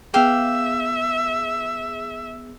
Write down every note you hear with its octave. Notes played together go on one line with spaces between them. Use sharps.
B3 G#4 E5 F5 G5 D6